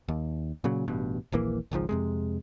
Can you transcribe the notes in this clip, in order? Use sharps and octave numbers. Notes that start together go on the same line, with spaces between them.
D#2
A#2 C#3 F#3
A1 G2 B2
D#1 A#1 E3 A#3
G#1 C#2 G#2 F3
F2 C3 G#3